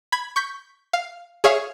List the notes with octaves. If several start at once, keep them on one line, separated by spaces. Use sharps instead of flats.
B5 G#6
C#6 G6 B6
F5
G#4 C#5 E5 F5